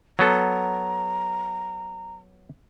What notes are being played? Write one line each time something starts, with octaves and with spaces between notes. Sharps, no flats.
F#3 B3 A4 A#5